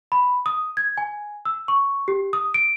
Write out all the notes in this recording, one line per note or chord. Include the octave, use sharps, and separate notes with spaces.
B5
D#6
G#6
G#5
E6
C#6
G4
D#6
D7